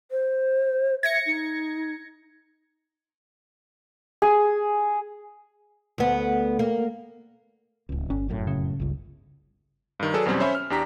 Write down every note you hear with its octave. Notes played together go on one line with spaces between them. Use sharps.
C5
E5 G#6 A#6 C#7
D#4
G#4
D2 B3
A#3
D1 C#2
G1 C#4
F1 F#2 A2
C#3
G1 C#2
G2 D#3
F#3 G#4 A4 B4 D5
E2 B2 F#3 G3 C4 C#4
C#4 C5 C#5 E5 B5
F6
E2 D4 G4 A#5 B6